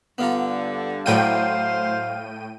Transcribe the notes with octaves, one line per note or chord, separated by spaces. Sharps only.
G2 D3 B3 F4 A#5
A2 F#3 C5 D5 F5 G5 D#7